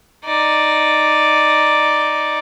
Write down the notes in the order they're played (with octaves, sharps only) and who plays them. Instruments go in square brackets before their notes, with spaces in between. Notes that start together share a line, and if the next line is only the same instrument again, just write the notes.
[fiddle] D#4 D5